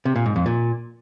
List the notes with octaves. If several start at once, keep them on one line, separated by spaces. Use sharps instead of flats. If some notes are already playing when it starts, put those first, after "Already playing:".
C3
A#2
G#2
F2
A#2